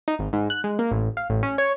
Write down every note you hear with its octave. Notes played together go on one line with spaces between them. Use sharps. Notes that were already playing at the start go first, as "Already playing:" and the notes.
D#4
G#1
G#2
F#6
G#3
A#3
A1
F5
A1
C#4
C#5